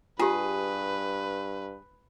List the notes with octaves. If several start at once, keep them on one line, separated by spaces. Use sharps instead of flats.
G2 F4 G4 G#4 B4